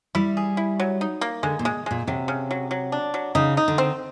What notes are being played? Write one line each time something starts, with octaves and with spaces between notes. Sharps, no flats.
G3 E4
G#4
E4
F#3
D#4
A#3
D3 G#3
A#2
G#3
A#2 G#3
C3 F#3
C#3
F#3
F#3
D4
F#3
C#3 D#4
D#4
D3
C4